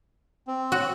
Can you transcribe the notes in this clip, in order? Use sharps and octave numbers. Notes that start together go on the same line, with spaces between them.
C4
F#4